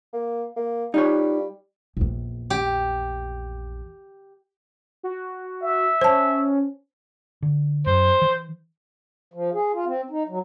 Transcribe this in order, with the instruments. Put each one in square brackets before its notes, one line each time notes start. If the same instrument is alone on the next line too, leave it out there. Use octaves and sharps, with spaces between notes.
[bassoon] A#3
A#3
[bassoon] G3 [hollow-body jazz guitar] D#4 F4 C#5
[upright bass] A#1 E2
[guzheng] G4
[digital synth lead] F#4
[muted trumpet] E5
[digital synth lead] C#4 [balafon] C5 A5
[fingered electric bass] D3
[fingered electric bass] F#2 [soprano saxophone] C5
[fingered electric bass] E3
[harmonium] F3
G#4
F4
C4
D#4
F#3